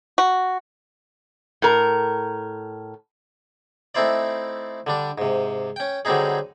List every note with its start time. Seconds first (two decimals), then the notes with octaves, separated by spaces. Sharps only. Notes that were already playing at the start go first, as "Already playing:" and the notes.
0.18 F#4
1.62 A2 A#4
3.95 A3 C4 D#4 E4 C5 D5
4.87 D3 G3 D4
5.18 G#2 C3
5.76 C#4 G5
6.05 D3 F#3 G3 C4 D#4 G#4